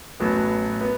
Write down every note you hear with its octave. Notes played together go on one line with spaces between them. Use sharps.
A1 A2 F#3 B3
B3